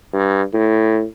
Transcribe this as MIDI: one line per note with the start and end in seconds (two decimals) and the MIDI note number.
0.13 0.42 43
0.53 1.05 45